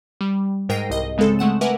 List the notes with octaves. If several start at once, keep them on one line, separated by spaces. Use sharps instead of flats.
G3
G#2 A#4 G5 A#6 C7 D#7
C2 D#5
C#3 G#3 C4 A4
G#3 A3 F#5 E7
A#4 B4 E5 F#5 G#5 D6